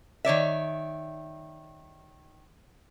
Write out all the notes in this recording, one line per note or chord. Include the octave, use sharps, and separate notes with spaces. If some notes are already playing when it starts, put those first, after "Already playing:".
D#3 C#5 D5 E5